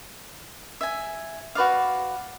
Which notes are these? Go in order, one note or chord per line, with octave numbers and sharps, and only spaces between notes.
E5 G#5
F#4 B4 D5 F5